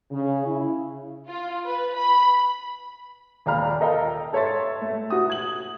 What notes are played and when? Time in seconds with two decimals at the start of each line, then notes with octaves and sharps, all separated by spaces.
0.11 C#3
0.46 E4
1.28 F4
1.65 B4
1.95 B5
3.46 D#1 D5 F5 A#5 B5 F6
3.80 A4 A#4 D#5 F5 G5 A#5
4.33 A4 C#5 E5 C6 A6
4.81 A3 E5
5.10 F#4 D#6
5.30 G#6 F#7